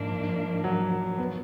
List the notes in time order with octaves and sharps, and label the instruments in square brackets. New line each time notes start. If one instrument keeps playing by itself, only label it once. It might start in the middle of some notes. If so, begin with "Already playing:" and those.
Already playing: [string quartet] G#2 F3 A#3 D4
[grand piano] F#3
B3